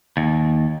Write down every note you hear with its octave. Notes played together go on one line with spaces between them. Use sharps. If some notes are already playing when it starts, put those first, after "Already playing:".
D#2